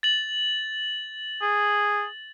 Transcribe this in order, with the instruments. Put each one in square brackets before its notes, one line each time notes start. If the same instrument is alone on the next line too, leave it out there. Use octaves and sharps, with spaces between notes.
[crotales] A6 F#7
[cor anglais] G#4